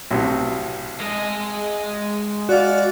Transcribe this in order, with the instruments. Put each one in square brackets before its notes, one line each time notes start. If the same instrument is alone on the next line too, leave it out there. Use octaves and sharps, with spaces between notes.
[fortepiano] B1 A2 C3
[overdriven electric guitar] G#3 D#5
[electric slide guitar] F#4 F5 [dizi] D5